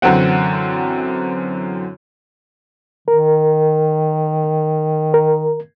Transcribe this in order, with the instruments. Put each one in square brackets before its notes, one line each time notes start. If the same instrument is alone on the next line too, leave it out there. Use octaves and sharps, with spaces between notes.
[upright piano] F#2 D3 E3 C4 F#5
[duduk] D#3 [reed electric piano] A#4
[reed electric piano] A#4